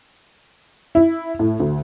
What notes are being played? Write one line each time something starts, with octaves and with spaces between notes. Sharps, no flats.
E4
A2
D2